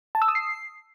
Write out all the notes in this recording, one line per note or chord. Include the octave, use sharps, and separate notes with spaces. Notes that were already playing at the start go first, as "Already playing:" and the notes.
A5
E6
D#6
C7